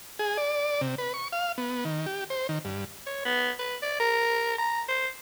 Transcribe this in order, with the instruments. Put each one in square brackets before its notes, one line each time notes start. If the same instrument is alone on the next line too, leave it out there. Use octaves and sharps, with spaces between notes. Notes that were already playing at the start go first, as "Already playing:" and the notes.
[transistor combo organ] G#4
D5
C3
B4
C#6
F5
B3
D#3
G4
C5
D#3
G2
[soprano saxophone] C#5
B3
B4
D5
A#4
A#5
C5